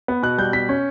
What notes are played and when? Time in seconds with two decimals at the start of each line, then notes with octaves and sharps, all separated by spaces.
0.08 B3
0.23 B2 F#6
0.38 G3 G6
0.53 B2 B6
0.69 C#4